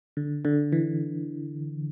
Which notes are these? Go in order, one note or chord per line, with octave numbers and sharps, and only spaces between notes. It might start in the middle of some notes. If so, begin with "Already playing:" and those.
D3
D3
E3